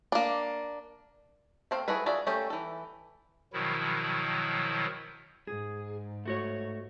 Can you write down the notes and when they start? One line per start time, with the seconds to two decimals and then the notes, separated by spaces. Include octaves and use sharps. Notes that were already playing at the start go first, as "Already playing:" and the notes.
0.12 A#3 D4
1.71 A3 C4 F5
1.88 E4 F#4 G#4 A4 B4
2.06 F4 F#4 G#4 D5 E5
2.27 A3 A#3 C#4 G4 A4
2.50 E3 A4
3.53 B2 D#3 F3 F#3 E4
5.47 G#2 G#4
6.26 A3 F#4 C#5